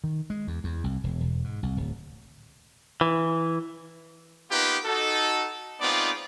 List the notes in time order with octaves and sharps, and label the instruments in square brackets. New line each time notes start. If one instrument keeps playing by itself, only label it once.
[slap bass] D#3
G#3
E2
E2
C2
E1
E1
G#2
C2
D1
[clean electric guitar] E3
[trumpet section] A#3 B3 D#4 F4 G4 B4
D#4 F#4 A4
G#3 B3 C4 D#4 F4 D5